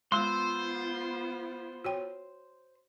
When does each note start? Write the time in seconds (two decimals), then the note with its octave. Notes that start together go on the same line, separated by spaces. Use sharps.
0.12 G#3 B3 F4 C5 C6 E6
1.85 F#4 C#5 G5